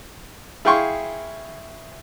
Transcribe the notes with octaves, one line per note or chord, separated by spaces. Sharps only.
E4 G#4 F5 G5 C6 C#6